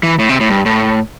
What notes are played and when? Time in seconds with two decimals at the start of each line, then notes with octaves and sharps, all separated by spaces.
0.03 E3
0.19 A2
0.29 C3
0.40 A2
0.50 G2
0.66 A2